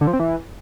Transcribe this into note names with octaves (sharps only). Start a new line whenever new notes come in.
D3
F3
C4
E3